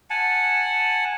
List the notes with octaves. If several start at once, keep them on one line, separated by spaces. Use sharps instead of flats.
F#5 G#5 A5